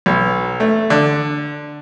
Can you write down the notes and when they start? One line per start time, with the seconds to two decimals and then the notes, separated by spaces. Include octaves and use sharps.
0.06 B1
0.60 A3
0.90 D3